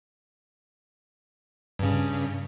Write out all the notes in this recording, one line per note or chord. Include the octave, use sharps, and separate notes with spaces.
G2 C#3